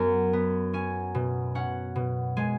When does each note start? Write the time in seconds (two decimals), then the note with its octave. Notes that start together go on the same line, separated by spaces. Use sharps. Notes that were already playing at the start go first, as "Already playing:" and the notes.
Already playing: F#2 B3 F#5 G#5
0.33 B3
0.73 C#4 G#5
1.15 B2
1.55 C#4 F#5
1.96 B2
2.37 G#3 G#5